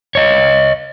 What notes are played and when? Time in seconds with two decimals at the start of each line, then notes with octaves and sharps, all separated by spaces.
0.15 C#5 D#5